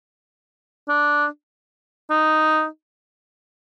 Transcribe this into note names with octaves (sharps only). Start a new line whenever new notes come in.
D4
D#4